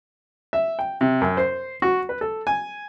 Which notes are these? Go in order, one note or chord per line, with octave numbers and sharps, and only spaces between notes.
E5
G5
C3
F#2
C5
F#4
B4
A4
G#5